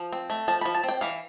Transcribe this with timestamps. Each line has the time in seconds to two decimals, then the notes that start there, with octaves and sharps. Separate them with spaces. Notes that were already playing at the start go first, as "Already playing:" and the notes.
Already playing: F3
0.13 C4
0.30 A3
0.48 F3 A5
0.61 F3 B5
0.75 A5
0.83 C4
0.89 G5
1.01 E3 F5